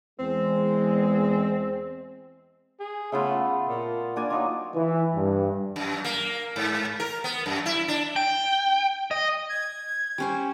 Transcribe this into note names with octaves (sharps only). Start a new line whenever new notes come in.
E2 G#3 C4
G#4
C#3 A3 B3 F4
A#2
A#3 D4 G#5
F#3 D#4 F4
E3
G2
F#2
A#3
G#2
A#4
B3
F#2
E4
D4
G5
D#5
G#6
G3 C#4 C5